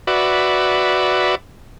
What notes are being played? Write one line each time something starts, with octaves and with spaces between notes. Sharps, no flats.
F#4 B4 D5 E5